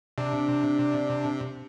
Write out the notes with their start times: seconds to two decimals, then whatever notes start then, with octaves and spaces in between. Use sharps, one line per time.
0.18 C3 D4